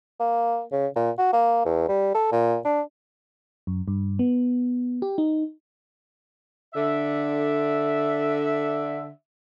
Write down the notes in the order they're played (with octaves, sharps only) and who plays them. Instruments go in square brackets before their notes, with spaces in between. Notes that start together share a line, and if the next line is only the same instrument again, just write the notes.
[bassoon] A#3
C#3
A#2
F#4
A#3
E2
G3
A4
A#2
D4
[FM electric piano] F#2
G2
B3
G4
D#4
[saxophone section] D3 E5